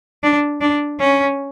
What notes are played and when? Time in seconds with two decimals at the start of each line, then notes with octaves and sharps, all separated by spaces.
0.23 D4
0.61 D4
1.00 C#4